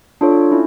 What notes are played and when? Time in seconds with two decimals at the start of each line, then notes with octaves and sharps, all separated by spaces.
0.21 D4 F4 A4 C#5
0.51 C#4 E4